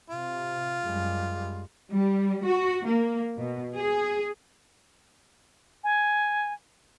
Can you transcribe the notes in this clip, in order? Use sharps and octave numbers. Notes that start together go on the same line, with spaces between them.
C3 F4
F#2 G3 G#3
G3
F#4
A#3
B2
G#4
G#5